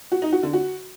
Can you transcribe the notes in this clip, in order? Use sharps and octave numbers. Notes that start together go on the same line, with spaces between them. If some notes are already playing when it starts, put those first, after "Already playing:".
F#4
D#4
F#4
D3
F#4